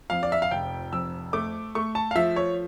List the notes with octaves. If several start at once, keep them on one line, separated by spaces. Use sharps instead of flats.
F2 F5
D5
E5
F5
F1 G5
F2 E6
A3 D6
A3 C#6
A5
F5
F3 E5
C#5